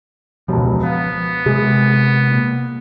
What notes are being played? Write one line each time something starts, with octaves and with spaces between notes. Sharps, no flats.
E1 C#2 F3
B3 F5
C3 G#3 G#4
A#2